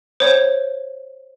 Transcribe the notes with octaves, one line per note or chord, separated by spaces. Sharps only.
C5 C#5